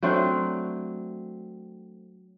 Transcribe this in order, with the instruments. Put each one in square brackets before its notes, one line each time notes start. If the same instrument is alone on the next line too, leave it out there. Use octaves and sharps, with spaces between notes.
[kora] F#3 A3 C4 D4